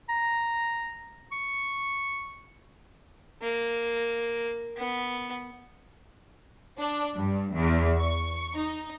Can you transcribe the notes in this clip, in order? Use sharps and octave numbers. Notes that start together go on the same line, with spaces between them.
A#5
C#6
A#3
B3
D4
G2
E2
C#6
D#4